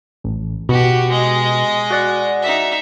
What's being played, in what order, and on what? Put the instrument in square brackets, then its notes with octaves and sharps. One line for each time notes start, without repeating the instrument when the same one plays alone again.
[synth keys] A1
[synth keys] B2 [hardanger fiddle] F#4 G4
[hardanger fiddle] G#3 D#5
[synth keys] F#4 D5 F#5
[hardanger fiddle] D#4 E5